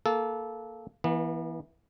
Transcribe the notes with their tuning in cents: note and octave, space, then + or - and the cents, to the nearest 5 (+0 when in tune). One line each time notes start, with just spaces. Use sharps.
A#3 -5 A4 -20
E3 +0 B3 -40